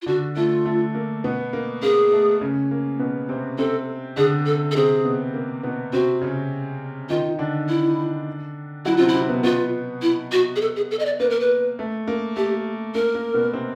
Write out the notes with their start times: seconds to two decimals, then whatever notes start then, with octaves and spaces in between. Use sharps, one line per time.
0.02 F4
0.06 D3 D4 F#4
0.36 A3 F4
0.66 A3
0.95 A#3
1.24 B2 B3
1.53 A#3
1.82 A#3 G#4
2.12 A3
2.41 C#3 C#4
2.71 A#3
2.99 B2 B3
3.29 C3 C4
3.58 C3 C4 A4
4.16 D3 D4 G#4
4.46 A4
4.71 A4
4.75 C3 C4 G#4
5.05 B2 B3
5.34 A#3
5.63 B2 B3
5.93 C3 C4 F#4
6.21 C#3 C#4
7.10 D#3 D#4 F4
7.38 D3 D4
7.69 E4
8.85 F#3 E4 F#4
8.97 C3 C4 F4
9.08 E4
9.15 C3 C4
9.29 B2 B3
9.43 B2 B3 F4
10.02 E4
10.32 F#4
10.56 G#4
10.61 A4
10.76 G#4
10.91 A4
10.99 D#5
11.05 D5
11.20 A#3 B4
11.30 A#4
11.40 B4
11.79 A3
12.07 A#3
12.36 A3 G4
12.95 A#3 A#4
13.15 A#3
13.34 B2 B3
13.53 C3 C4